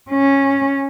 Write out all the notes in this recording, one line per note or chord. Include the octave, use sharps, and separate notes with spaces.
C#4